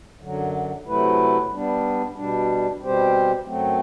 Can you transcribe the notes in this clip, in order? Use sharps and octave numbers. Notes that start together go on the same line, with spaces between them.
F#2 D3 F#3
C3 F#3 A3 E4 B4
G3 B3 D4
B2 G3 D4
B2 G3 C4 G4 C5
F#2 F#3 A3 C4